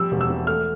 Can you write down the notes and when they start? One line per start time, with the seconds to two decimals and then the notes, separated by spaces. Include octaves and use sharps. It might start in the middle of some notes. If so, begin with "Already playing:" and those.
Already playing: F3 G3 E6
0.12 E1
0.21 E6
0.30 E3
0.47 A3 F6